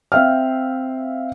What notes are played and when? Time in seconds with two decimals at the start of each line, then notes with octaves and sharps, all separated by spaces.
0.12 C4 E5 F5 G5 F6